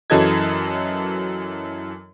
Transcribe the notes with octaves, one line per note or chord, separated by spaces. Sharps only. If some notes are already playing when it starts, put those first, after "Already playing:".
F#2 E3 F#3 A4 D#5 G#6